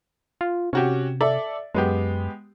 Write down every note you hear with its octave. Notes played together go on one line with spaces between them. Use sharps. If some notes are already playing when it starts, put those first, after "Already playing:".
F4
C3 C#4 F#4 G4
A4 D5 E5
F#2 G#3 B3 G4